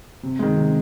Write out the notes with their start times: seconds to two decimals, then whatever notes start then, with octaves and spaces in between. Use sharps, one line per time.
0.23 C3
0.39 D#3 G#3
0.57 C3